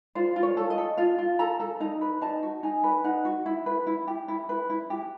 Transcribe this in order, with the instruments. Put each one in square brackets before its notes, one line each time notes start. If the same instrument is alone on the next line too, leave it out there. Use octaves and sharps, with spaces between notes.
[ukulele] F4 C5
F4
C#5
A4
D#5
A4
F4 F5
F4
A4 A#5
A4
D#4 A#5
B4
D#4 A5
F#4
D#4 G#5
B4
D#4 F#5
F#4
E4
B4
E4
G4
E4
B4
E4
G4